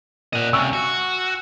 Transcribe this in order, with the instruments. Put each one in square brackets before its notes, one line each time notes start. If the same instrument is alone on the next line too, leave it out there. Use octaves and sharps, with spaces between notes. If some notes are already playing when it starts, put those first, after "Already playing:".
[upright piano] A#2 [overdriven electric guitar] D#5 F#5
[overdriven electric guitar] C#2 C3 [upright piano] G#5 C#6 E6
[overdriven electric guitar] F#4